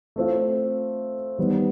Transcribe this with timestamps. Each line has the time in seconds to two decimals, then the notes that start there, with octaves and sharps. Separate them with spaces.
0.16 A3 C4 F4
1.38 D#3 G3 B3